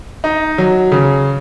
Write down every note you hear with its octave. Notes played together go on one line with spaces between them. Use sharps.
D#4
F#3
C#3